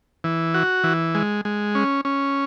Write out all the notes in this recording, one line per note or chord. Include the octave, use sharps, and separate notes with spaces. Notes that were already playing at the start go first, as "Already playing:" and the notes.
E3
F#4
E3
G#3
G#3
C#4
C#4